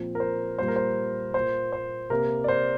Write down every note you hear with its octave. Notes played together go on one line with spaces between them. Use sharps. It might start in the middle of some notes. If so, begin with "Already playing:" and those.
Already playing: A#2 F3 C4
A#4
C5
A#2 G3 A#3 C5
A#4
C5
A#3 C5
A#2
C5
C3 A#3 A#4
D5
C5